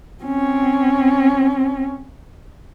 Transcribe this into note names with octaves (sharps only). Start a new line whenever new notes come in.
C4 C#4